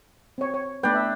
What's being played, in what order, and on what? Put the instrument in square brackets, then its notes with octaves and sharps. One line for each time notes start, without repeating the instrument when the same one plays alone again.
[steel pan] C4 C#5
C#5
[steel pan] A3 B3 B4 [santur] D4 G5
[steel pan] E5